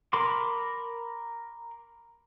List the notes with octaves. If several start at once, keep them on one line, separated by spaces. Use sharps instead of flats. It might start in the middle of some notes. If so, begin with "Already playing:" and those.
A#4 B5 C6 D6